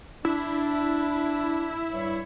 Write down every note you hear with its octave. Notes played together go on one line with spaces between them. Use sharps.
D4 E4
G2 G3 C#5